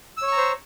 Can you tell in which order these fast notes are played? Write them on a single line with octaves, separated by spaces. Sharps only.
E6 C#5 C#6 A#5 C5